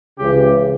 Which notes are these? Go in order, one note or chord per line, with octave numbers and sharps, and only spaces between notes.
C#2 C#3 E3 G4